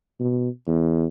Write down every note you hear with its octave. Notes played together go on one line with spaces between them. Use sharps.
B2
E2